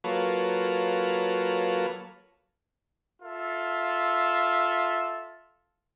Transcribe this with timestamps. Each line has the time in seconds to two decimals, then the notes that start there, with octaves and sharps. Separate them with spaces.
0.04 F#3 A#3 F4 A4 B4 C#5
3.22 F4 A4 E5